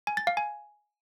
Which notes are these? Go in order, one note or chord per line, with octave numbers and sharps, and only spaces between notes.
G#5
A6
F5
G#5